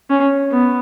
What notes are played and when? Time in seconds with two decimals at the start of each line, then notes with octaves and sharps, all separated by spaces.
0.10 C#4
0.51 B3